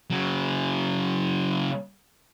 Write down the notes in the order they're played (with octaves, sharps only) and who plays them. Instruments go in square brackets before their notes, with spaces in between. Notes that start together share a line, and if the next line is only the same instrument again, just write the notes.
[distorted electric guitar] C#3 F#3